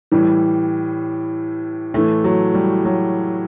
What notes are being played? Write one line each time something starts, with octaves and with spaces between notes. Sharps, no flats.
A2 E3 G3
A2 E3 A3
F#3
G3
F#3